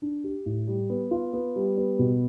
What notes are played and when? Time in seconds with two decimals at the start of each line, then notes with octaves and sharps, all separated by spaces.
0.02 D4
0.24 G4
0.46 A2
0.68 G3
0.90 B3
1.11 F4
1.33 B3
1.56 G3
1.78 B3
1.99 B2